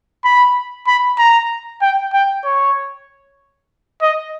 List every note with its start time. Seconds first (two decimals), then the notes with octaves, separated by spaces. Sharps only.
0.25 B5
0.87 B5
1.19 A#5
1.82 G5
2.13 G5
2.45 C#5
4.02 D#5